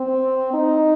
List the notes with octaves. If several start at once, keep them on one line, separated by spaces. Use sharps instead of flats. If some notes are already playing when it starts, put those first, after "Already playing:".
Already playing: C4
D#4